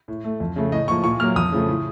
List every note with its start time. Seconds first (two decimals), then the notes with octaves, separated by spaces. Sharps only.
0.08 A2
0.24 A3
0.40 F2
0.56 C#3 A3
0.72 A2 D#5
0.88 F3 A#3 C#6
1.04 A#2 C#6
1.20 F#3 A#3 F6
1.36 F2 D#6
1.52 C#3 F3 A3
1.68 A2